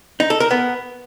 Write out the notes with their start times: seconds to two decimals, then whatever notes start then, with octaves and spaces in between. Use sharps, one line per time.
0.20 D#4
0.30 A4
0.40 A#4
0.51 B3